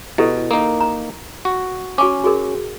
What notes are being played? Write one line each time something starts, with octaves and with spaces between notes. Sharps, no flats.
B2 E4 G4 A4
A#3 D#4 A#4
A#5
F#4
C#4 F#4 G#5 D6
F#4 G#4 A#4